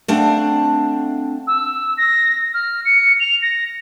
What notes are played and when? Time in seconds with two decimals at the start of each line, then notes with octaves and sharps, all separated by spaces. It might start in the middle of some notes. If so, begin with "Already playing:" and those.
0.08 A3 C4 D4 F5 F#5
1.47 E6
1.98 A#6
2.54 F6
2.85 C#7
3.20 F7
3.42 A#6